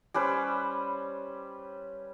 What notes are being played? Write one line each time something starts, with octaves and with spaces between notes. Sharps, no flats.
G3 C#4 B4 C5